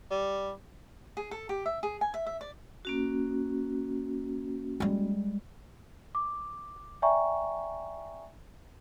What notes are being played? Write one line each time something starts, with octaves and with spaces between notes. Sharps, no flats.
G3
G#4
A4
G4
E5
G#4
G#5
E5
E5
D5
A#3 C#4 F#4
G3 G#3
D6
D5 E5 G5 G#5 A#5 C#6